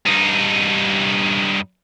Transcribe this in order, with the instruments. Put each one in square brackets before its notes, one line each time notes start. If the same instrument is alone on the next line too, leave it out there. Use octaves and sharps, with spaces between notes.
[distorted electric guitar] G2 D#4